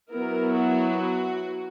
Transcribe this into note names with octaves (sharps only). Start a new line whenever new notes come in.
F#3 B3 E4 A#4
F#4